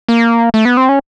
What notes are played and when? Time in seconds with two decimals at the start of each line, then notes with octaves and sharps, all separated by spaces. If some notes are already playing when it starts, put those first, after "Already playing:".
0.09 A#3
0.54 A3
0.65 B3
0.77 C4
0.89 C#4